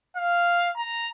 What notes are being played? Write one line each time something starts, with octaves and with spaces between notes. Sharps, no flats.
F5
A#5